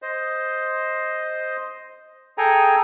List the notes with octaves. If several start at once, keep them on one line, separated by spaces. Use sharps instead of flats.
C5 D#5
G#4 A4 G5 G#5 A#5